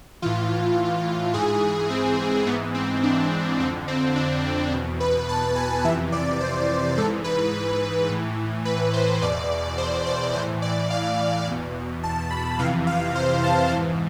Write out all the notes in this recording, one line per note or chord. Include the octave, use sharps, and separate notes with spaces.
A2 E3 F4
G#2 E3 G#4
C4
G#2 E3 B3
C4
D4
F2 D3 C4
C4
D4
E2 B2
B4
A5
G#5
F2 C3 E3 E5
D5
C5
G#2 E3 A4
B4
A2 E3
B4
C5
E2 B2 D5
C5
D5
A2 E3 C5
D5
F5
E2 B2
A5
B5
F2 C3 E3 F5
F5
C5
A5
G#2 E3